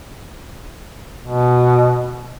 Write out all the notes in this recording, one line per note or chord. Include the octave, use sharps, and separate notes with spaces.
B2